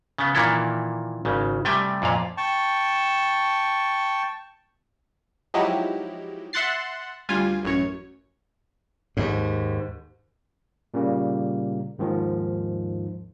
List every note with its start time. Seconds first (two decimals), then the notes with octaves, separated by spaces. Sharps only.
0.18 C#3 B3
0.35 A#2 D#3 E3 A#3 E4 A4
1.25 G#1 C#3
1.65 C3 G3 A3 G5 G#5
2.02 F2 A#2 F5
2.37 G5 A5 C#6
5.54 F3 F#3 G#3 D#4 E4 G4
6.53 E5 F#5 C6 F#6 A6 C7
7.29 D2 G3 F4 G#5
7.63 A1 F#2 C#5
9.17 D#2 G#2
10.94 A#2 C#3 G3 A#3
11.99 D#2 G#2 D#3 F3